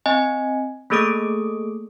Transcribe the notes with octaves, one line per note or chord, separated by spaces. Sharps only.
C4 D#5 G#5
A3 A#3 G#4 A4 D#6 D7